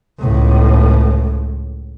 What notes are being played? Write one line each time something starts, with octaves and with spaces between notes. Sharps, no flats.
C#2 A2